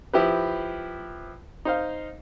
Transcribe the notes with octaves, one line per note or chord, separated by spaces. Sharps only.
F3 E4 G4 B4
D#4 C5 F5